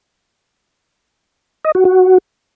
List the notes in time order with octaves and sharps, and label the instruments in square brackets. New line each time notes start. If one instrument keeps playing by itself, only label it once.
[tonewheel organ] D#5
F#4
F#4